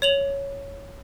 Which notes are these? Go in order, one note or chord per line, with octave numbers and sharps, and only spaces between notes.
C#5 F7 F#7